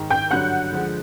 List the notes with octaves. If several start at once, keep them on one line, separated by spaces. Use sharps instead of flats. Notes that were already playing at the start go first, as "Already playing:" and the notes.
Already playing: G#2 D#3 G#3
G5 G6
G2 D3 F#3 F#5 F#6
D3 F3 G#3